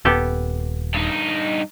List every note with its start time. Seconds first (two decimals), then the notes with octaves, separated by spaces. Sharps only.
0.05 D#1 B3 G4 A4
0.95 G2 D#4